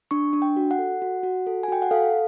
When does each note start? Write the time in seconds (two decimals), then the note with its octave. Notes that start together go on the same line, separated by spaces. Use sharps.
0.11 D4 C#6
0.33 D4
0.42 G5
0.56 F#4
0.71 F#5
0.79 A4
1.02 F#4
1.23 F#4
1.47 A4
1.63 G#5
1.68 F#4 G5
1.82 F#5
1.91 A4 F5